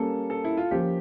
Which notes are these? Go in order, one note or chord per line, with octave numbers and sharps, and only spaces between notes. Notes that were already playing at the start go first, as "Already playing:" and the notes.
Already playing: G3 A#3 C#4 A4
A4
E4
F4
F3 A#3 C#4 G4